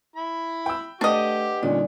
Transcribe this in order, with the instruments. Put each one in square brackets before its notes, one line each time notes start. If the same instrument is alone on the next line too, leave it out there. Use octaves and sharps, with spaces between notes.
[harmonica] E4 B5
[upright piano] G5 E6
[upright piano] A3 [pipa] D4 D#5 [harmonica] G4 [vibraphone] B4 F#5
[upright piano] A#2 D3 C#4 [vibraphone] G3 D#4 D5